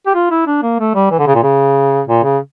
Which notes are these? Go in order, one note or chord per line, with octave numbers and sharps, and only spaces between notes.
G4
F4
E4
D4
A#3
A3
G3
E3
D3
C#3
A#2
C#3
A#2
C#3